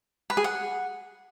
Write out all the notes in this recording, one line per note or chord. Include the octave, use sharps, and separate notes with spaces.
B4
G#4
F#5